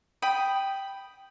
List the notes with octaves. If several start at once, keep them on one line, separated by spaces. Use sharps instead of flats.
G5 B5 D#6